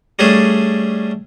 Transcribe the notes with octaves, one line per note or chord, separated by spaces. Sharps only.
G3 A3 C#4 D4 G#4 A4